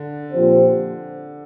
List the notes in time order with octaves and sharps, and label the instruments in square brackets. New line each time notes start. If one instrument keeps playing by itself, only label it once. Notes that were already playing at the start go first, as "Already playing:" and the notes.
Already playing: [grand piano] D3
[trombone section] A#2 F3 C4 G4 C5